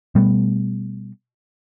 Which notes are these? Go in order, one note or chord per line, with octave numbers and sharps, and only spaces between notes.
B2 G3 A3 B3